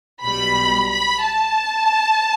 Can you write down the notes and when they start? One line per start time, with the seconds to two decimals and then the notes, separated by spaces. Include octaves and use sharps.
0.24 B1 B2 G3 B5
0.90 B5
1.25 A5